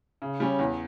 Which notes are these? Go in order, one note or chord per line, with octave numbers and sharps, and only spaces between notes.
C#3
G3 C#4
E2